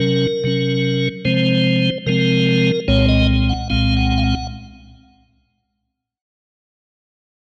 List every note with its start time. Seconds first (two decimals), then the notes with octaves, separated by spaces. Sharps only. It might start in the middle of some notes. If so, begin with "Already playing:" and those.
Already playing: C3 F#3 C#4 A#4
0.44 C3 F#3 C#4
1.25 C3 F3 G#3 C4 C5
2.06 C3 F3 G#3 C4 A#4
2.88 C2 A#2 G#3 C4 C#5
3.09 D#5
3.49 F#5
3.70 C2 A#2 G#3 C4 F5
3.97 F#5
4.18 F5
4.24 F#5